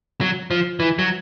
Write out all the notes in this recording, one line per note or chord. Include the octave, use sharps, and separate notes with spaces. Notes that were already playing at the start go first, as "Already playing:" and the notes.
F#3
F3
E3
F#3